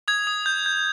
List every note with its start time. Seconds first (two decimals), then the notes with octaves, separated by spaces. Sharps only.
0.08 D#6 G#6
0.27 D#6
0.46 G6
0.66 G6